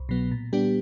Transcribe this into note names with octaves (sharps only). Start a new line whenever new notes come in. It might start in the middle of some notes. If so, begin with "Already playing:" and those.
Already playing: C2
B2 F#3 B3
A#2
G3 B3 D4 G4